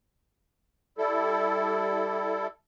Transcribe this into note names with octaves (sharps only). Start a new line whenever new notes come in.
G3 E4 A4